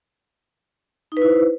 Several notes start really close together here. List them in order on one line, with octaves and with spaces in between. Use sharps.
D#4 B4 E4 C5